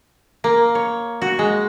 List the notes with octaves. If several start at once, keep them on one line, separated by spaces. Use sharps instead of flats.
A#3
C#5
F#4
G#3